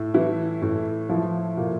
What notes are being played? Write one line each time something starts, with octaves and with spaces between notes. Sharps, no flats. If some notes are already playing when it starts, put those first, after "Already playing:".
Already playing: A2
E3 E4
A2
F3 E4
A#2